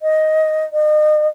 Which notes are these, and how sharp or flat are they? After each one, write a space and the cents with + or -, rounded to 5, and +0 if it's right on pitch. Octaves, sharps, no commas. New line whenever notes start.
D#5 +5
D#5 -40